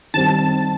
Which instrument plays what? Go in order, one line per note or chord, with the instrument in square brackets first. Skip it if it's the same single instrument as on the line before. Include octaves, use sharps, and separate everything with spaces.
[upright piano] D#3 G3 C4 [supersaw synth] A5